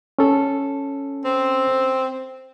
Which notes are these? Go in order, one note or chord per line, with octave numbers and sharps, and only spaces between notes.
C#4 A4
C4